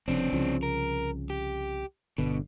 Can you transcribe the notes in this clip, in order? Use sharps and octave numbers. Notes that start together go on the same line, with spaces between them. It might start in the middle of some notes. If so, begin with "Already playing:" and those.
F1 F2 C#3 C4 D4
C2 C#3 F3
A#4
G4
G1 B2 D3